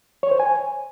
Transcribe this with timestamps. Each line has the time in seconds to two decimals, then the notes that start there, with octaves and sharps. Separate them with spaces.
0.23 C#5
0.31 C5
0.40 G#5